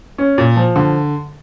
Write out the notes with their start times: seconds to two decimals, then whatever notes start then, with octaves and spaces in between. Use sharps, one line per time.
0.18 C#4
0.38 A#2
0.56 F3
0.76 D3